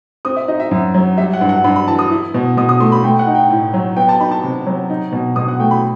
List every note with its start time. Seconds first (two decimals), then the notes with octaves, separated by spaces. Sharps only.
0.25 C4 D#6
0.36 E5
0.48 D#4 D#5
0.60 E5
0.71 F#2
0.94 F#3
1.18 G3 E5
1.33 F#5
1.41 G2
1.49 F#5
1.64 G2 B5
1.76 B5
1.87 E3 A5
1.99 D#6
2.11 E4
2.34 B2
2.57 B2 D#6
2.69 D#6
2.80 A3 C6
2.92 B5
3.04 A3 G5
3.19 F#5
3.27 D#4
3.35 G5
3.50 A2
3.74 F#3
3.97 B3 G5
4.09 A5
4.20 D#4 B5
4.31 A5
4.43 C3
4.66 F#3
4.90 D#4
5.12 B2
5.36 B2 D#6
5.48 F#5
5.59 A3 G5
5.71 B5